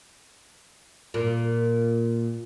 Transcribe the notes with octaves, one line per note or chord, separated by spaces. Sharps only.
A#2